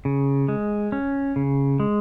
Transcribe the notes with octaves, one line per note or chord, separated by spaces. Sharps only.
C#3
G#3
C#4
C#3
G#3